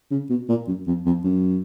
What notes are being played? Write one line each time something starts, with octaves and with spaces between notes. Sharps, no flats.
C#3
B2
A#2
F#2
F2
F2
F#2